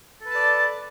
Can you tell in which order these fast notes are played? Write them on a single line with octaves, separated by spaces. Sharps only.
A4 B4 A5 D5